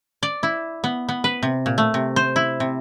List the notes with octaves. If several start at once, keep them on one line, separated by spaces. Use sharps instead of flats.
D5
E4
B3
B3
B4
C3
A#2
A3
C3
C5
E4
C3